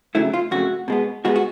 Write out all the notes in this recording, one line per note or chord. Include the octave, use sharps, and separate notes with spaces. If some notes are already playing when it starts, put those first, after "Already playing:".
F2 C#3 F#3 A3 E4
F4
F2 C#3 F#3 A3 F#4
B2 G#3 B3
B2 G#3 B3 F#4
F#4